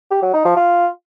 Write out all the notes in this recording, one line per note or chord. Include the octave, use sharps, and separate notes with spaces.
G4
F#3
D#4
F3
F4